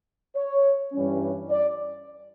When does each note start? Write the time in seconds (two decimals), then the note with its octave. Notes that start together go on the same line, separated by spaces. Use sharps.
0.36 C#5
0.93 G2 E3 G3 C#4
1.50 D5